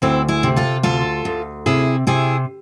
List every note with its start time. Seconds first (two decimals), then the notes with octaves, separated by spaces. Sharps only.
0.02 D2 C4 E4
0.28 E4 G#4
0.43 C3
0.56 F4 A4
0.83 D2 F4 A4
1.25 D2
1.66 C3 E4 G#4
2.07 C3 E4 G#4